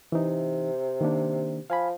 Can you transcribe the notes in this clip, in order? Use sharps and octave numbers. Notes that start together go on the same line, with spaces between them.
C3 E3 D#4
D#3 A#3 D4
F3 F5 G#5 B5